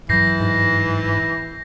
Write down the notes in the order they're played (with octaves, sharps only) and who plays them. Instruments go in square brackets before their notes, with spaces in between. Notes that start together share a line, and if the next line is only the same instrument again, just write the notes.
[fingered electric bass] G2 F#3 [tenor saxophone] E3 [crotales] G6 A#6 C7
[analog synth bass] G#2